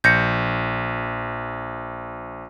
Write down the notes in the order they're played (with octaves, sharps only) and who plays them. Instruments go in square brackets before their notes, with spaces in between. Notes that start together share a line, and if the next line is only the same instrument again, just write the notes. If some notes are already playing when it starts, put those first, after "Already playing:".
[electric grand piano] A#1 [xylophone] G6 A#6 C#7